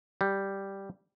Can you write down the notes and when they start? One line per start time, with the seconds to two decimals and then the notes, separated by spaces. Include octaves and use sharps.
0.21 G3